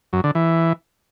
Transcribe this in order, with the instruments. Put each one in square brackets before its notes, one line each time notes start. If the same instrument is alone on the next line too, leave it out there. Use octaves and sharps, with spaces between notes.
[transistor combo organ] F#2
D3
E3